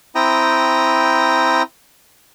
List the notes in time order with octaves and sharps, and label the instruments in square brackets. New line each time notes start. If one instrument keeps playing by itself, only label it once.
[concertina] C4 E4 G5 A#5 D#6